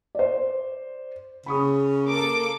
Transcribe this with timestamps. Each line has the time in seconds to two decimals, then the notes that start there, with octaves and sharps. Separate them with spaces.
0.15 C5 D5
1.46 C#3 B5 C#6 D#6
2.08 A#3 A4 D6